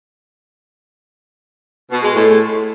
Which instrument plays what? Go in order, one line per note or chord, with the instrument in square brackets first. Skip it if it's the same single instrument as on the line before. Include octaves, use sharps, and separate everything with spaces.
[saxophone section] B2
G#3
A2